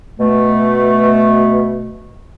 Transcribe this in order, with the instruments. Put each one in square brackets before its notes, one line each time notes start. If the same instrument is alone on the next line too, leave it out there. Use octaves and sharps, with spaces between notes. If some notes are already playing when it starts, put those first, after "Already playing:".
[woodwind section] B2 A3